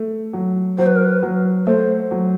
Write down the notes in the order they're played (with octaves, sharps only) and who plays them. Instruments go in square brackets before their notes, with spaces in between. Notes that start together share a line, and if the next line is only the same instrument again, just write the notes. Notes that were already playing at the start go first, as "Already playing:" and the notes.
Already playing: [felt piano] A3
F#3
[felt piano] F#3 [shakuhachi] C5
[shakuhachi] B4
A#4
B4
[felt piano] F#3
[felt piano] A3 [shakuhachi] C5
[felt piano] F#3